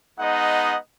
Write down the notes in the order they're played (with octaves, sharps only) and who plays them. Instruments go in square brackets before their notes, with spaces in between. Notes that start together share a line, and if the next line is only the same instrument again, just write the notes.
[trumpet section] G#3 B3 D#4 D#5 F#5